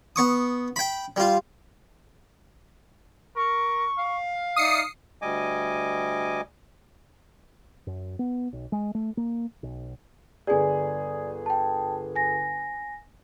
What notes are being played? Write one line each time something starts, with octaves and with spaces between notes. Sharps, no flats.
B3 C#6 D#6
G5 B5
G3 F4
A#4 C#6
F5
D#4 D5 E5 D#6 C7 C#7
D2 G3 D#5 G#5 D6
F#2
B3
B1
G#3
A3
A#3
B1
G1 G#4 D5 G#5
G5 A5
G#5 A#6